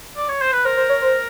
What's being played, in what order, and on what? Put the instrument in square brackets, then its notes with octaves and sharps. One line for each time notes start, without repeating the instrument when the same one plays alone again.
[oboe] D5
C#5
C5
B4
[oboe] A#4 [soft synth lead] C5
[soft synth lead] C5
C#5
C5